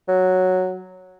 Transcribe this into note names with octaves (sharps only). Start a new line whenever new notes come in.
F#3